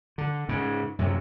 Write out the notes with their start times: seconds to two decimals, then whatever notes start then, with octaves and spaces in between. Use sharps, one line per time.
0.18 D3
0.49 G#2 C#3
0.99 F#2 C3 F#3